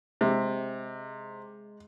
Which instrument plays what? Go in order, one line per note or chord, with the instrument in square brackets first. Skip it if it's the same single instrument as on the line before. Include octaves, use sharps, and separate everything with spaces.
[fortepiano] C3 [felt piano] G#3